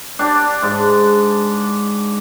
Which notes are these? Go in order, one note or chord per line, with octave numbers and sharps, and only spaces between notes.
D4 G4 D5
G#2